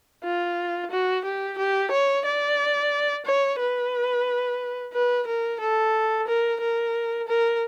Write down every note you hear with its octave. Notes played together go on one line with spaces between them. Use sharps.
F4
F#4
G4
G4
C#5
D5
C#5
B4
B4
A#4
A4
A#4
A#4
A#4